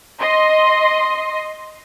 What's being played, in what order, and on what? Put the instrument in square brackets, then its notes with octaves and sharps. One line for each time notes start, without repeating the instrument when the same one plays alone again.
[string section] D#5 C6